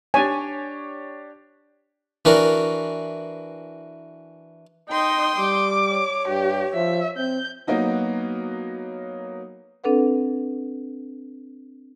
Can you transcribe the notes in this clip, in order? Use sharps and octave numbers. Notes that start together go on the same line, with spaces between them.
D4 G4 C#5 G#5
E3 D4 F#4 A#4
D#4 G5 C6 D#6
G3 D6
C#5
G2 G4
F3 E5
C4 G6
F#3 A#3 B3 D#4 F#4
C4 D4 A4 B4 F#5